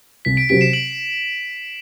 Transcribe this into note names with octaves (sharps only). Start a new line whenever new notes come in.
C2 B6
B6 D7
C3 F#3 C4 G4 B6 D7
C7 E7
D7 F#7